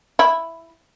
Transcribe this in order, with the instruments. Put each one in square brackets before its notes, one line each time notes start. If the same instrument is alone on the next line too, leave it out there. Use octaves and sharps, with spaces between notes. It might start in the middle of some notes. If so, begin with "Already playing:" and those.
[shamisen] E4